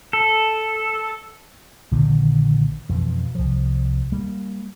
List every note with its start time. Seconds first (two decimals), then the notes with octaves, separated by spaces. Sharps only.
0.13 A4
1.91 A#1 D3 D#3 A#3
2.89 F2 B2 E3
3.35 C2 F3
4.12 G3 A#3